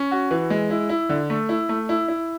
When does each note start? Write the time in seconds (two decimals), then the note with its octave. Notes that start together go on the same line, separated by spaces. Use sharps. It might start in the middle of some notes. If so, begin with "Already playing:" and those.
Already playing: C#4
0.11 F#4
0.31 E3
0.50 G#3
0.70 E4
0.89 E4
1.09 D3
1.30 A3
1.49 E4
1.69 A3
1.89 E4
2.08 E4